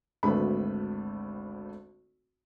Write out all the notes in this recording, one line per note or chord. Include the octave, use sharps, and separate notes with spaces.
G#1 D2 A3 B3 B5